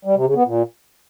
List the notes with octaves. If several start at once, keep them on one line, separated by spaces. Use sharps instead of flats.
G3
C3
C#3
B3
A#2